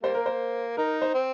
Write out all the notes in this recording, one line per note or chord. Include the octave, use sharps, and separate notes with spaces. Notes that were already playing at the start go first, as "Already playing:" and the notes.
G3 A#3 C5
A#4
C5
D#4 A#4
C5
C4